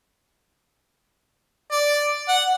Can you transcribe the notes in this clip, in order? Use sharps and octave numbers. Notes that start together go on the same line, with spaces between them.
D5
F#5